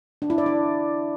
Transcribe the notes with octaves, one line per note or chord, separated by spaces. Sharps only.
D4
E4
D5
D4